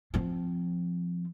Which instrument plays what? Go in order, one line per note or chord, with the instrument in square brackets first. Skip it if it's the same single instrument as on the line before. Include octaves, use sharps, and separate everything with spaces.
[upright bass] F3 C4